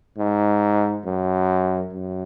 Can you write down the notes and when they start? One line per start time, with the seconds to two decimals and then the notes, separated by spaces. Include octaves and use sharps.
0.18 G#2
1.05 F#2
1.92 F#2